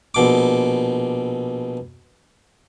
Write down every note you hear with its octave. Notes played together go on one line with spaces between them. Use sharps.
A#1 B2 D6